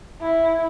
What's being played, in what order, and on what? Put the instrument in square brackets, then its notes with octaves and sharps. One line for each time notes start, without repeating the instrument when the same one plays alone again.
[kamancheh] E4